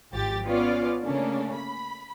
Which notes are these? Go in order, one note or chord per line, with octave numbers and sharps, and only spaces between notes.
G#1 F3 G4 A6
B3 C#4 F4 D5 F5
C#3 A3 A#3 C#4 D4
B5